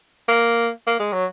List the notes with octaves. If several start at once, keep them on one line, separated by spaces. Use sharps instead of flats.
A#3
A#3
G#3
F#3